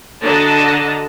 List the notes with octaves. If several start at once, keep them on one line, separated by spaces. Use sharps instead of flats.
D3 D4 F#4 D#5 A5 A#5